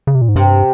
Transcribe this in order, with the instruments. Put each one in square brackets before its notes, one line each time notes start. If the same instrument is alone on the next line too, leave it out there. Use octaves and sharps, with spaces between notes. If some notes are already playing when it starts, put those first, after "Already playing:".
[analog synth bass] C#3
C3
A#2
G#2
[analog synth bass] G2 [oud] C3